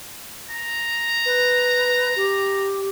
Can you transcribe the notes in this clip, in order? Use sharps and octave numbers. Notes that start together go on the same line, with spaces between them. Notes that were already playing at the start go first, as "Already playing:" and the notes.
A#5
B4
G4